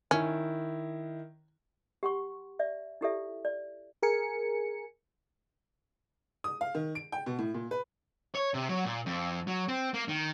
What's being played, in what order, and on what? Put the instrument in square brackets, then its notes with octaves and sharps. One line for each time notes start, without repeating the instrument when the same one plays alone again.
[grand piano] D#3 E4 [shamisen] C#4
[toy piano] G4 F#5 C6 C#6
D5 E5
D#4 E4 G4 A4 D5 E5
D5
[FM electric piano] G#4 A#4 G#5 C#7
[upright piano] D#6
F5
D#3
D7
G5
B2
A2
A#2
B4
[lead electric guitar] C#5
C3
F#3
A#2
F2
F#3
C4
A#3
D#3